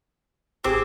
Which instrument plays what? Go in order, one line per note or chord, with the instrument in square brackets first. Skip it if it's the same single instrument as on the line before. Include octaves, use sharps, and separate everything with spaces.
[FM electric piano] G#1 G4 E6 [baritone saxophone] C4 [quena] G#4 [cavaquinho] D6